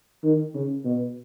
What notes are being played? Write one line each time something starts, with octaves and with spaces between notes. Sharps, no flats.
D#3
C#3
B2